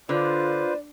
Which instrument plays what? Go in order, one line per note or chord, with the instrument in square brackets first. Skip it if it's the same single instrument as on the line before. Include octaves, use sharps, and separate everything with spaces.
[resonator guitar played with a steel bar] D3 [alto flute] F4 [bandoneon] B4 C5 [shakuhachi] D5